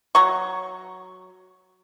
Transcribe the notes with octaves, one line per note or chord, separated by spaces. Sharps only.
F#3 A#5 C#6